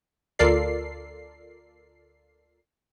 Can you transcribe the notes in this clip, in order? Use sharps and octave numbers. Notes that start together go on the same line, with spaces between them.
D2 F4 A4 A#4 D5 C7